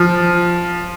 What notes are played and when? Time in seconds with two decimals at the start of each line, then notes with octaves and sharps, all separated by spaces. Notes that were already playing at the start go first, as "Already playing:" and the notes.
Already playing: F3